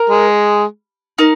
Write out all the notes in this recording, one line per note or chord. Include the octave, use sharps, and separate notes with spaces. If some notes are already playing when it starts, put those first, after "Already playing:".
Already playing: A#4
G#3
D#4 A#4